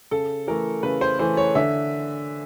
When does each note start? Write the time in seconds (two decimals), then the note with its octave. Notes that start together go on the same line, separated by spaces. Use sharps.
0.11 C#3 A4
0.47 E3 A3 A#4
0.83 C#3 B4
1.01 C5
1.19 E3 A3 C5
1.37 C#5
1.55 D3 E5